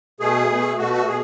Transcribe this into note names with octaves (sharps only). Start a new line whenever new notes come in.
B2 A3 G#4
B2 A3
B2 A3 F#4
F#4
B2 G#4